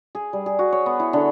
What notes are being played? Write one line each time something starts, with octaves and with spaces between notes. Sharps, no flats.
G#4
G3
G#4
F#4
C#5
B3
E4
D3